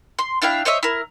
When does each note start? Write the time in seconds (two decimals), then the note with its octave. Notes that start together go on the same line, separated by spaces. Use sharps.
0.19 C6
0.42 D4 E4 F5 G5
0.65 C5 C#5 D#5 E5
0.83 E4 A#4